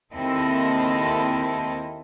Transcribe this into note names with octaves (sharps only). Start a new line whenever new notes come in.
D#2 A#3 C4 E4 A4 D#5